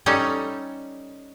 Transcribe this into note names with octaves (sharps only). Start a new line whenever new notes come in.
G3 C#4 D#4 A4